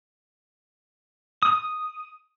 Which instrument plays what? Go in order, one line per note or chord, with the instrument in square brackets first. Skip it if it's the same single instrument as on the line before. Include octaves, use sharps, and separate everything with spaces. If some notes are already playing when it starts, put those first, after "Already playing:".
[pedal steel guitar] D#6